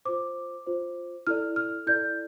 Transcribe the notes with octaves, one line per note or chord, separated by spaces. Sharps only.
F4 C5 D6
F4 C5
E4 A4 D5 F6
F6
E4 A4 D5 G6